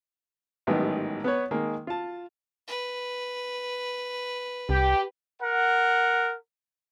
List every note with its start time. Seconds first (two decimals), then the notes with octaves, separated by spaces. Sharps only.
0.67 A1 G#2 D#3 F#3 G3 B3
1.24 B3 B4 C#5
1.51 D#3 G#3 A#3
1.87 F4 A5
2.68 B4
4.69 C2 G4
5.42 A#4 F#5